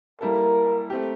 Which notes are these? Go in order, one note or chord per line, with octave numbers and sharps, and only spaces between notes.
G3 A#3 E4 A4 A#4
A3 C4 G4